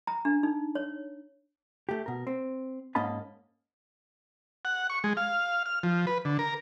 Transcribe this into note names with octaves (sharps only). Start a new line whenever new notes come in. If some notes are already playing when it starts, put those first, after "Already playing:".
A#5
D4
D#4
C#5
A3 G4
B2 A#4
C4
G#2 A#3 C#4 D#5 A5 B5
F#5
C#6
G#3
F5
F6
F3
B4
D3
A#4